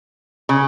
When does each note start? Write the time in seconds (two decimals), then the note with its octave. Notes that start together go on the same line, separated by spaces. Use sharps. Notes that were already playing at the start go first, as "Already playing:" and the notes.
0.49 C#3